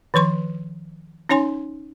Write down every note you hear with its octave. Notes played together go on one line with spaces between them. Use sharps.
D#3 F3 B4 C6 C#6
C#4 D#4 C#5 G#5 C6